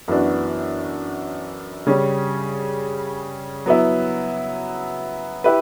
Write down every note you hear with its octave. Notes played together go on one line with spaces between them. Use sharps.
F#2 E3 B3 D4 F#4
C#3 G3 C#4
F#3 B3 E4
E4 G4 B4